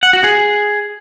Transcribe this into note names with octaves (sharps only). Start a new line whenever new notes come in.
F#5
F#4
G#4